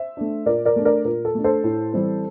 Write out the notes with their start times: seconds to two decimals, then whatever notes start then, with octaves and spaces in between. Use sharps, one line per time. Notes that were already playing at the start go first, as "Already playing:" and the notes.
Already playing: C5 E5
0.17 A3 D4
0.46 A#2 A#4 D5
0.65 A#4 D5
0.76 A3 D4
0.85 A#4 D5
1.05 A#2 A#4
1.25 A4
1.35 A3 D4
1.44 A4 C5
1.64 A2
1.93 E3 G3 C4